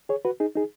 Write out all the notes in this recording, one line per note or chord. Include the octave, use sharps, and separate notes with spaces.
G#4 C#5
F#4 B4
D#4 G#4
D#4 G#4